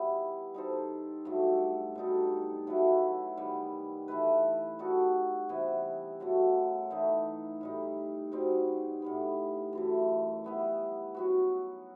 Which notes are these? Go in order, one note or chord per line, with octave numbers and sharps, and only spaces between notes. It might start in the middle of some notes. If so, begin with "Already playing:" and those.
Already playing: G3 B3 E4
G3 D#4 A4 C5
G2 F#3 A3
B2 G3 D#4 A4
F#3 A3 E4 B4
D#3 G3 B3
E3 A3 E4 B4
G3 D#4 F#4 A4
C3 E3 B3
F#2 F#3 A3
E3 A3 D#4
A2 G3 D#4
B2 G3 C4 D#4
A2 G3 B3
F#2 E3 A3
G3 B3 E4
F#3 B3 F#4